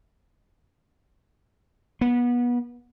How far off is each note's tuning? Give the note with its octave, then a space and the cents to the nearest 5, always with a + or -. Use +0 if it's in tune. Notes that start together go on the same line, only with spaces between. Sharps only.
B3 -25